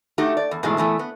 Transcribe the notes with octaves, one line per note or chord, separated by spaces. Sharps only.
A3 D#4 F#4 G4
D5
E2
G#2 B2 E3 G#3 A3
A#2 E3 A3 B3
B3